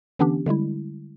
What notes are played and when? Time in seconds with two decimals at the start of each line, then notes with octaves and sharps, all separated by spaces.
0.19 D3 E3 B3 C#4 D4 G4
0.46 D3 G3 G#3 E4